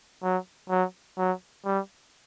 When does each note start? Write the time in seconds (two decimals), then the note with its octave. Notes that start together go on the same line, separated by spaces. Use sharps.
0.23 F#3
0.70 F#3
1.18 F#3
1.65 G3